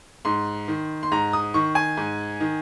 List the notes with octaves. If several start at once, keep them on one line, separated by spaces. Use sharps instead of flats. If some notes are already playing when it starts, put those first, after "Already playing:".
G#2 C6
D#3
C6
G#2 A#5
D#6
D#3 C#6
G#5
G#2
D#3